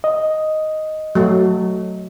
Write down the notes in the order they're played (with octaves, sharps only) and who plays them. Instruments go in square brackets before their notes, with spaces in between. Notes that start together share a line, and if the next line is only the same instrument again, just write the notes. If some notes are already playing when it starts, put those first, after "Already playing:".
[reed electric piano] D#5
[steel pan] F#3 A3